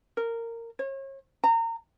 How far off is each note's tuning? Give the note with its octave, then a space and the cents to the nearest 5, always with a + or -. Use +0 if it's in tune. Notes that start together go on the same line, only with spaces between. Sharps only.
A#4 -15
C#5 -35
A#5 -30